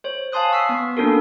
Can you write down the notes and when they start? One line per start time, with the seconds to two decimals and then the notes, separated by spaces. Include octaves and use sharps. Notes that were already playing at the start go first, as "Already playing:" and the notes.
0.04 C5 C#5
0.32 F5 G#5 A5 C6 D#6 F#6
0.52 C#6 E6 B6 C7
0.69 B3
0.97 A#3 C#4 D4 F#4 A4 A#4